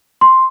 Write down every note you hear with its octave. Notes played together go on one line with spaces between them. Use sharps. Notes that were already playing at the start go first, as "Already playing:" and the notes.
C6